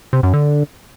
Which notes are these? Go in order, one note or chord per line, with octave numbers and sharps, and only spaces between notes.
C3
F#2
D3